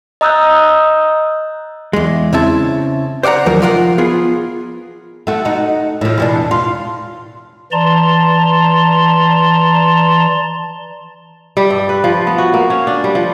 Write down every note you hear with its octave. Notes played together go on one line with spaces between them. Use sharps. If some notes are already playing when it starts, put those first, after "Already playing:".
D#5 A#5 D#6 E6 F#6 G6
E2 G#3
C#3 C4 E4 E5 A5
C5 D5 F5 F#5 A#5
D#2 F3 F#3 A#3 A#4
F3 F4 A#4 F5 F#5
B3 F4 G#4
A3 F#4
D#4 F#4
A2 F3
E2 B2 D4
F4
E3 D5 A5 A#5 C6
G3
G2
B4
F3
B3
F#4
A#3
C#4
D4
G3
F3